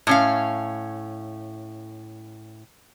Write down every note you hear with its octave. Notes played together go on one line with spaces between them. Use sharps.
A2 C#4 F5